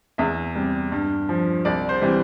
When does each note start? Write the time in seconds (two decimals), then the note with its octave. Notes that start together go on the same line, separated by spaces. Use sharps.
0.18 E2 E5
0.55 C3 G3
0.92 G2
1.29 F3
1.65 C2 D5
1.89 C5
2.01 C3 E3 G3